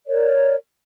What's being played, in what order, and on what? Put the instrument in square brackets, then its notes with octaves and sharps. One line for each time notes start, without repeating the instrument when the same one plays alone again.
[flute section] A#4 C#5 D5